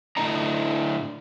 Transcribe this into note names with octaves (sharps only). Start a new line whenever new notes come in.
A2 D3 D4 E4 D#5 A#5